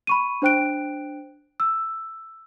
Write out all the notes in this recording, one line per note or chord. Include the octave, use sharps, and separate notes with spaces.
B5 C#6 D#7
D4 C5 G5 F#6 D7
E6